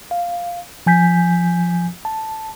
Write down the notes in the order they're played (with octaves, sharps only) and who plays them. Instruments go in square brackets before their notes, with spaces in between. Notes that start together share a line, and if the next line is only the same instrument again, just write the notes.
[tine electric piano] F5
F3 G#5 G6 B6
A5